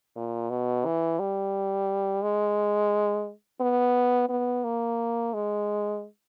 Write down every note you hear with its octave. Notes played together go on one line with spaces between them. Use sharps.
A#2
B2
E3
G3
G#3
B3
B3
A#3
G#3